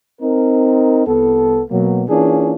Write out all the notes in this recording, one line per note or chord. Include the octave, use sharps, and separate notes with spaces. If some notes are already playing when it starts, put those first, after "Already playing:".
C4 D#4 A#4
C2 B3 A4
B2 F#3 A#3
E3 A#3 C#4 D4 F4 G#4